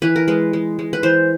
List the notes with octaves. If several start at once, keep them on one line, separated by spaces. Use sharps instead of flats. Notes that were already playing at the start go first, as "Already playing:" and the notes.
E3 B4
A#4
G#3 B4
G#3
G#3
B4
E3 C5